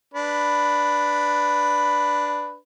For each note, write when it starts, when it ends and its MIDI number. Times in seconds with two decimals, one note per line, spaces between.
0.14 2.56 62
0.14 2.56 71
0.14 2.56 83